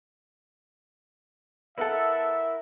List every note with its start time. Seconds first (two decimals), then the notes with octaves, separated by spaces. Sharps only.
1.78 B3 E4 A4 A#4 E5 F#5